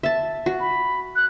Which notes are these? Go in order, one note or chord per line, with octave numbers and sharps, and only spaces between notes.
E5 A5
F#4
B5
F#6